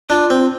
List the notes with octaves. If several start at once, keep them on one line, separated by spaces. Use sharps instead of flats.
D4 F4
C4